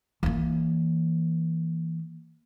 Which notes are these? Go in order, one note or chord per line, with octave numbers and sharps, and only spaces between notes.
E3 A#3